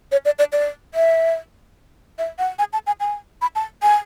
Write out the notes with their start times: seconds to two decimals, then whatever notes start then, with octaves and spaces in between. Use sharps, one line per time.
0.12 C#5
0.25 D5
0.39 D5
0.53 D5
0.94 E5
2.19 E5
2.39 F#5
2.59 G#5
2.73 A5
2.87 G#5
3.00 G#5
3.42 B5
3.55 A5
3.83 G#5